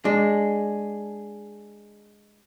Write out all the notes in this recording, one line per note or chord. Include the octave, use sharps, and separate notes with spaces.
G#3 D4